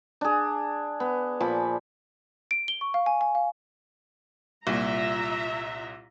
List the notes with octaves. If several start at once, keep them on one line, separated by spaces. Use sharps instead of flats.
D4 G#4
B3
A#2 F3 G#5 B5
D7
G7
C#6
F5
G#5
G#5
F5
C2 A#2 F4 E5 A#5